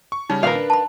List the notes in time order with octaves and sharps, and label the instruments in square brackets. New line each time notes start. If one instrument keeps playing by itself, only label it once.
[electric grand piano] C#6
[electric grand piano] C#3 G3 C#4 [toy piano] D#4
[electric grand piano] A#2 D#3 [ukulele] A#4 B4 F5
[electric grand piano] D4
[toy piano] A5 B5